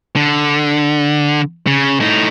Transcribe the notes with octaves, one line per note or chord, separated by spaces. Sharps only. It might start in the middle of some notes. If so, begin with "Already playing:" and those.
D3
C#3
A2 D#4